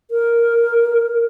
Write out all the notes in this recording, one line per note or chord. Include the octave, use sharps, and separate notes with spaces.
A#4